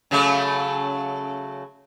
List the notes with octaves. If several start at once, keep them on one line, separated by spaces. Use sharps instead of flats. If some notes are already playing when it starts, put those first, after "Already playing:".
C#3 F#3 A3